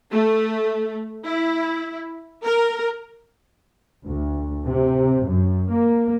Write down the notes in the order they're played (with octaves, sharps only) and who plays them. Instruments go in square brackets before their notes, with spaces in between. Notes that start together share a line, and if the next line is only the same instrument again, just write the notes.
[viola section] A3
E4
A#4
[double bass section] D2
C3
F#2
A#3